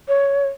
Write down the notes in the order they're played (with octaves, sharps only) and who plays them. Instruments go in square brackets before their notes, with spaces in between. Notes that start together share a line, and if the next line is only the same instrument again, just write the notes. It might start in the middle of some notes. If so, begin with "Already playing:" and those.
[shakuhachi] C#5